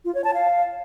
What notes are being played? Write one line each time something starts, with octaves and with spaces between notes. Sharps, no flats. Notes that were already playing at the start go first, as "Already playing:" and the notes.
F4
C#5
A5
F5